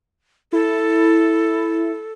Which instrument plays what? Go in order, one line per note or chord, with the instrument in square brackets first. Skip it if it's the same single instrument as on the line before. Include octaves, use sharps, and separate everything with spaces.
[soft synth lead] E4 [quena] A4